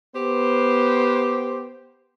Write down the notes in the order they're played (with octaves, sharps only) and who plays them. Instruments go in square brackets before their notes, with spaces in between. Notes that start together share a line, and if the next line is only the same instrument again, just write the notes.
[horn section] B3 G4 C5